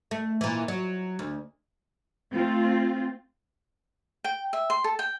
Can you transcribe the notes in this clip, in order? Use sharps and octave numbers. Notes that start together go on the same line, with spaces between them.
A3
A#2 E3
F#3
D2
A3 C4 F4
G5
E5
C6
A4
G5